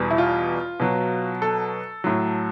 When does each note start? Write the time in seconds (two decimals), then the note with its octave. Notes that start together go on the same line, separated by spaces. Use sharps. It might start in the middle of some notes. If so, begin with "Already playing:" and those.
Already playing: E2 B2 G3
0.11 E4
0.18 F4
0.80 B2 F#3
1.42 A4
2.04 A2 F#3